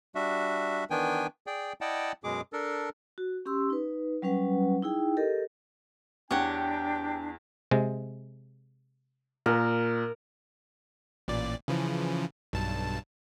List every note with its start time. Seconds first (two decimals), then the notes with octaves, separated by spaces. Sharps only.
0.15 G3 D4 F#4 E5
0.90 D#3 E3 B3 D4 G5 G#5
1.47 G#4 D5 G5
1.81 E4 D5 D#5 F#5 G5 A5
2.24 F#2 B2 G#3 G#4 D6
2.53 D4 A4 A#4
3.18 F#4
3.46 C#4 G4 C6 E6
3.70 D#4 B4
4.22 F#3 G3 C#4 B4 F#5
4.83 D#4 E4 G#4 G5
5.17 G4 A4 A#4 D#5
6.31 E2 D4 G4 C#5 F#5 G5
7.71 C3 G#3
9.46 A#2 A#4
11.28 A1 A#2 D5
11.68 C#3 E3 F3
12.53 B1 G2 A5